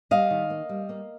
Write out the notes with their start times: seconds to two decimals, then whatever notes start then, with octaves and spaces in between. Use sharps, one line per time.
0.11 G3 D#5 F5
0.31 D#3
0.50 A#3
0.69 G3
0.89 A#3